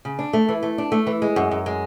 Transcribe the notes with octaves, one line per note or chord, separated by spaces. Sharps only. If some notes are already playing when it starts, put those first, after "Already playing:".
C#3
D4
A3
E3
A3
D4
A3
E3
G#3
F#2
F#2
G#3